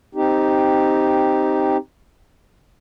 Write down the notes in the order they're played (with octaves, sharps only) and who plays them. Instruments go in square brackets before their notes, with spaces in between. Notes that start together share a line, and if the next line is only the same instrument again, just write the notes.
[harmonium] C4 D#4 G4